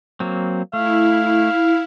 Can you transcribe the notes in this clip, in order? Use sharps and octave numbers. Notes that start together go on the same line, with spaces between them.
F#3 A#3 C4
A3 E4 F5